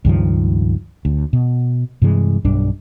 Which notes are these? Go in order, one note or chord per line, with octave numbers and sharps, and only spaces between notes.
C#2 G2 D#3 F3
D2
B2
G2 C3 E3 G#3
B1 G2 D4